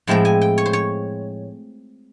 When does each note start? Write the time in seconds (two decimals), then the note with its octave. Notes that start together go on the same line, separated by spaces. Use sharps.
0.07 A2 F3 G#3 C4 E4 G5
0.25 G#5
0.41 G5
0.58 C#5
0.66 C5
0.73 C#5